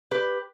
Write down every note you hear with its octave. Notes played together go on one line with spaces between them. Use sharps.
G4 B4